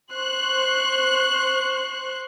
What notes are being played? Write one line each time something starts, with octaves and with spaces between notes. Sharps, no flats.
C5 C6 C#6 F#6